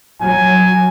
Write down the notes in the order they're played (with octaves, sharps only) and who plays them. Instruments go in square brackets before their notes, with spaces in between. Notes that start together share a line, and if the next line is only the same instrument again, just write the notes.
[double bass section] F#3 [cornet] G#5